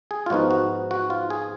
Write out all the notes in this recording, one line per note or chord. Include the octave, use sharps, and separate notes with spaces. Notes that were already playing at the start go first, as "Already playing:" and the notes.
G#4
F4
G#2 F3 B3 D#4 F#4
F#4
F#4
F4
G#4